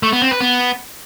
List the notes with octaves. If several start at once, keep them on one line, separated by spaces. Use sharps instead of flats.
A3
B3
C4
B4
B3